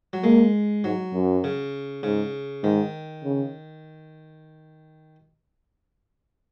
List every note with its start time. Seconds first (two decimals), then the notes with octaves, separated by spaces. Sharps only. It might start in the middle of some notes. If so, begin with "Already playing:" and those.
0.13 F#3
0.24 G#3 A#3
0.84 G#2 F#3
1.14 F#2
1.44 C#3
2.03 G#2 C#3
2.64 G#2 D#3
3.24 C#3